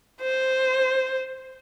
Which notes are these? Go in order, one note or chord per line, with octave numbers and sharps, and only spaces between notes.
C5